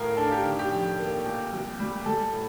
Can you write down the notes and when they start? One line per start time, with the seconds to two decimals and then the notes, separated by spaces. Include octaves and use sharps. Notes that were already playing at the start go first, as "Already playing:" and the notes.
Already playing: A2 A3 A#4 F5
0.17 D4 A4
0.32 G4
0.45 D#3
0.59 G4
0.71 F2
0.99 A#3
1.25 A#2
1.53 C2
1.80 G3
2.06 G3 A4
2.33 A2